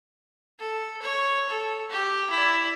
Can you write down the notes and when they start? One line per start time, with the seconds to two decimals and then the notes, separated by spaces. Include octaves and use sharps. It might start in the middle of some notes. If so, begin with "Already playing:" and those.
0.59 A4
1.02 C#5
1.49 A4
1.90 G4
2.30 E4 D5